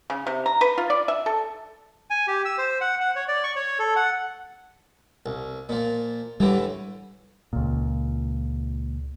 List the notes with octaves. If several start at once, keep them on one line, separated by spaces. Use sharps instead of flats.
C#3
C3
A#5
B4
F4
D5
E5
A4
G#5
G4
E6
C5
F#5
F#5
C#5
D5
C#6
C#5
A4
F#5
C2
A#2 F3
A2 D3 E3 G3
C#2 A#2